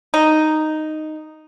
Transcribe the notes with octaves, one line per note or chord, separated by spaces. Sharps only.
D#4